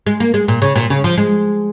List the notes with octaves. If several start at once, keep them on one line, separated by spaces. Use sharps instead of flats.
G#3
A#3
G#3
A#2
C#3
A#2
C#3
F3
G#3